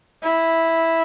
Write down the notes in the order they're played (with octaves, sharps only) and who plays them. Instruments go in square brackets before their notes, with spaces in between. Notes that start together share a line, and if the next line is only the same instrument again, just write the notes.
[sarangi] E4